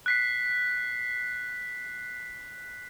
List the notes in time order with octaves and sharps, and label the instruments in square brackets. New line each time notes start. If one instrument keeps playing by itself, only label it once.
[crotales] F#6 B6 C7